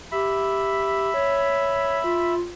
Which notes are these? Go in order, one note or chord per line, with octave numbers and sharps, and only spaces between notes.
G4 E5 B5
C#5
F4